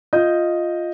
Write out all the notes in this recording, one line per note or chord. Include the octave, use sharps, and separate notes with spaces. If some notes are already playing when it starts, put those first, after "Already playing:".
F4 D#5 G6